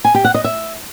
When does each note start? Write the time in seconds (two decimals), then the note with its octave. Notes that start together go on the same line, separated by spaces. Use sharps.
0.05 G#5
0.15 G4
0.25 F#5
0.34 D#5
0.44 E5